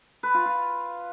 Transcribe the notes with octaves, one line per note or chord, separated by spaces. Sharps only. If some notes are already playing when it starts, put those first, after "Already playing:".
B4
F4
F4